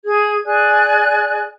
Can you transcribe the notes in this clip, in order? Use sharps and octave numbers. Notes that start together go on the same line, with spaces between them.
G#4 G#6
G#4 D5 G#5 F#6